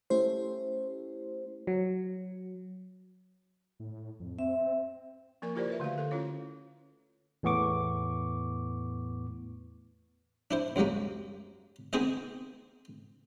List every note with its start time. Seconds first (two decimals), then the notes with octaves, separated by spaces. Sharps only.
0.10 A3 C#4 E4 G4 C5
1.67 F#3
3.80 A2
4.20 F2
4.39 C4 E5
5.42 F3 A#3 A#4 C#6
5.55 E4 F4 G4 A#4 C5 D5
5.68 A#4 B4 E5
5.80 D3 A3 F#4 F5
5.98 A4
6.11 C#4 E4 F4 C#5
7.43 E2 A2 B3 C#6 D6
10.51 D4 E4 C5
10.76 C#2 F#2 G3 G#3 A#3
11.93 D#3 B3 C4 G#4 C5 D#5